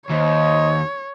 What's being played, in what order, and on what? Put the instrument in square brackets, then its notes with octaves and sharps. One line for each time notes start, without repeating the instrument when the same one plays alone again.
[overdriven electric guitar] D#2 [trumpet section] C5 D#5 [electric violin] C#5